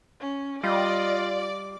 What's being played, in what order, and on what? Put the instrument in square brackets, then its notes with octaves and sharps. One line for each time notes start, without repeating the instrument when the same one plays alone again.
[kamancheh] C#4
[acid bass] G3 [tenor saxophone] F4 [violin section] D5 [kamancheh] D#5
[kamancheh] D6